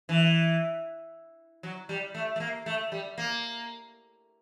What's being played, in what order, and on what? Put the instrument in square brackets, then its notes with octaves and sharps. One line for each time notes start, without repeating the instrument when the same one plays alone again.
[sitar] E3
F#3
G3
A3
A3
A#3
A3
G3
A#3